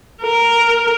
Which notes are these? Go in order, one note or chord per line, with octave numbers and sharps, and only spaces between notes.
A#4